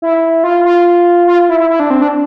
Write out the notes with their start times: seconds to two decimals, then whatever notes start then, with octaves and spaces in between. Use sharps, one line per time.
0.02 E4
0.44 F4
0.65 F4
1.27 F4
1.49 E4
1.59 E4
1.70 E4
1.80 D4
1.90 C4
2.02 D4